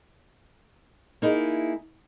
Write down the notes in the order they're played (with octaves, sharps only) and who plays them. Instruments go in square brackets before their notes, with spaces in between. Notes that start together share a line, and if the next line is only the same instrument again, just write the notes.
[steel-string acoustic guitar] A#3 D#4 E4 G#4